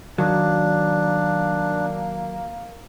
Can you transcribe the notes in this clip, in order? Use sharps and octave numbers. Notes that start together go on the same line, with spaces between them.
D#3 F#3 A#3 D4